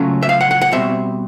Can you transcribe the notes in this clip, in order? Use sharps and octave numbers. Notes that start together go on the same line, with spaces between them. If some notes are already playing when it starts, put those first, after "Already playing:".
Already playing: C#3 F#3 A3 C#4 F4
E5
F5
F#5
F#5
F#5
B2 G3 C4 E5